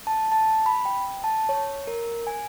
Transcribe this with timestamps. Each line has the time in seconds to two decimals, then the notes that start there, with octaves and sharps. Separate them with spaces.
0.07 A5
0.32 A5
0.66 B5
0.85 G5
1.24 A5
1.49 C#5
1.87 A#4
2.27 G#5